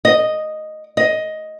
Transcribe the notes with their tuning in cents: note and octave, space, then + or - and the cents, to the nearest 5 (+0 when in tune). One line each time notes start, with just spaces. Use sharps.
D#5 -5
D#5 +10